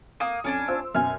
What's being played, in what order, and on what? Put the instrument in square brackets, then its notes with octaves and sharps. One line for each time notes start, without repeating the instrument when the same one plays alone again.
[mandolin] A#3 [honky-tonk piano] D#6 D#7
[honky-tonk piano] F2 [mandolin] C#4 D4 G#5
[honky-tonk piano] F4 C5 E6
[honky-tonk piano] F#2 B2 [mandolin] G#5 F6